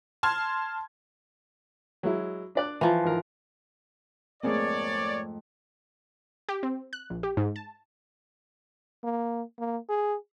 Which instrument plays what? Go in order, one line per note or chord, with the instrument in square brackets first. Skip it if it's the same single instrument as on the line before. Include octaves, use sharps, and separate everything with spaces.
[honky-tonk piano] A5 C6 F6 G#6
[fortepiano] F#3 G#3 E4
D4 D5 F#6
[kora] E3 F3 [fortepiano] A#5
[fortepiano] G#1 A#4
[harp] F2 G#2 A3 [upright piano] A#3 C4 G#4 [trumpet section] C#5 D5
[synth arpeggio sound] G4
C4
F#6
A#1
G4
G#2
A5
[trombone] A#3
A#3
G#4